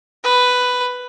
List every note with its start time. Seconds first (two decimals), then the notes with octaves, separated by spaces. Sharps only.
0.24 B4